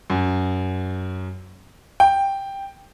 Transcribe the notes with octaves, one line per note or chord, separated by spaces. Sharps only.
F#2
G5